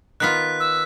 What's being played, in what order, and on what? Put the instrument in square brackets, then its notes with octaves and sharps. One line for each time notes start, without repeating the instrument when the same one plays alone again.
[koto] D#3 B3 F4 [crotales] F#6 B6
[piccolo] E6